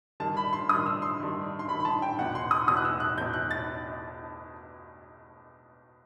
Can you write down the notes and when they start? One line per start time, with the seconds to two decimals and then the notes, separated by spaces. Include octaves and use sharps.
0.20 G2 D#3 A5
0.37 B5
0.53 C6
0.69 G2 D#3 D#6
0.86 E6
1.02 C6
1.20 G2 D#3
1.59 C6
1.69 G2 D#3 B5
1.80 B5
1.85 A5
2.02 G5
2.18 E2 B2 F#5
2.35 C6
2.51 D#6
2.67 E2 B2 D#6
2.77 F#6
2.85 E6
3.00 F#6
3.17 E2 B2 G6
3.34 F#6
3.51 A6